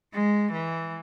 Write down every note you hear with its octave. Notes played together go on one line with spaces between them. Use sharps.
G#3
E3